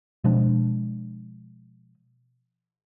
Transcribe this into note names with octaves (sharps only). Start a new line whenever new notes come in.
B2 F3 G#3 D4